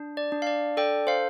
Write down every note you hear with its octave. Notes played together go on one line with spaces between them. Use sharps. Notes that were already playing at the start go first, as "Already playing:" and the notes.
Already playing: D4
D5
D4
F5
D5
A4 D5 G5
C5 F5